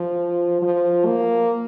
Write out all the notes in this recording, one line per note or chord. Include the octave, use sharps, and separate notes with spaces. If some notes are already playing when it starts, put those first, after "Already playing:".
Already playing: F3
F3
A#3